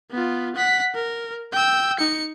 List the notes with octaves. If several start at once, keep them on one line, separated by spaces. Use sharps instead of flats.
B3 F4
F#5 B6
A#4
G5 E6
D#4 C#7